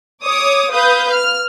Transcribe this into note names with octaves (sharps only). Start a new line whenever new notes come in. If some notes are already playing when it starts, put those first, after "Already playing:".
C#5 D6 D#6
B4 F5 D#6 G6
F6